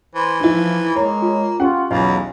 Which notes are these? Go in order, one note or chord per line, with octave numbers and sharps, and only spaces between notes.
E3 C5
F3 D#4 E4
G#3 A#3 C#5
F4
C#4 F4 G4 F#5
B1 E2 F#3 D#5 F5